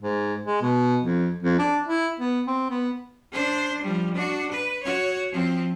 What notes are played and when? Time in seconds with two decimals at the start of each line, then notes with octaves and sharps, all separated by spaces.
0.02 G#2
0.46 G#3
0.62 B2
1.04 F2
1.43 F2
1.59 D4
1.87 E4
2.20 B3
2.47 C4
2.70 B3
3.32 D4 C5
3.83 F3 G3
4.14 D4 F#4
4.52 B4
4.83 F#4 C#5
5.31 F3 C4